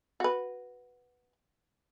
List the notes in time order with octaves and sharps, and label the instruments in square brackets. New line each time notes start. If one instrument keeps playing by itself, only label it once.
[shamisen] F#4 B4